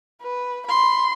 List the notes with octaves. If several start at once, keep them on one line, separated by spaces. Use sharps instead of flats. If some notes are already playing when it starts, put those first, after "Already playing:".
B4
B5 C6